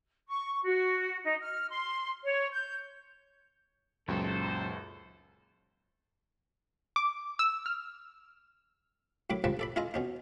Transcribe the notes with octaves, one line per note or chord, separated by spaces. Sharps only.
C#6
F#4
D#4
F6
C6
C#5
G6
C#2 F#2 A#2 F#3 D#4 A4 C5
D6
E6
F6
F#2 A2 B5 D6
C#2 G2 F3 B4 D5 A5
A4 D5 B5
E4 F4 G#4 D#5 A#5 D#6
B2 C#4 D#4